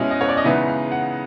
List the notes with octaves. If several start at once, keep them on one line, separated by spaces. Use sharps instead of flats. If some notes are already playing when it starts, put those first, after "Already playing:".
Already playing: B2 G#3 C#4 E4 D#5
D#5
C#5
D5
D#5
C#3 E3 G#3 B3 D#4 E5
F5
F#5